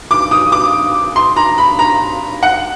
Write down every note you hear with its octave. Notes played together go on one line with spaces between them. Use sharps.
D6
D#6
D6
C6
A#5
B5
A#5
F#5